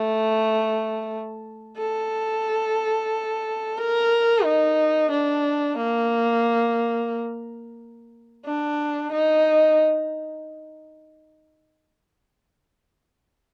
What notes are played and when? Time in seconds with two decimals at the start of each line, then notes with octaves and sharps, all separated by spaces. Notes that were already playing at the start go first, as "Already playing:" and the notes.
Already playing: A3
1.78 A4
3.78 A#4
4.45 D#4
5.11 D4
5.78 A#3
8.45 D4
9.12 D#4